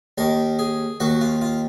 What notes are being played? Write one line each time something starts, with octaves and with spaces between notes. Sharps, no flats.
D#2 D#3 A#4
G#4
D#2 D#3 F#4
F4
F4